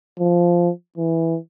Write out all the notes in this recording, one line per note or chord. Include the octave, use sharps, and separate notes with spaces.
F3
E3